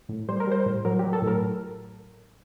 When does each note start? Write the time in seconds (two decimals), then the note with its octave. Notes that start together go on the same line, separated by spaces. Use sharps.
0.09 A2
0.29 G3 C5
0.40 A#4
0.47 G3 C5
0.66 A2
0.85 F#3 A#4
0.99 F#3 G4
1.13 A4
1.22 A2
1.27 A#4